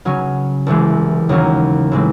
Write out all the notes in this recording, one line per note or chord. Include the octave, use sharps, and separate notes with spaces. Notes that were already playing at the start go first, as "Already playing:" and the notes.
C#3 F#3 C#4
C2 C3 E3 G#3
D#2 C#3 F#3 C#4
A2 E3 G#3 C4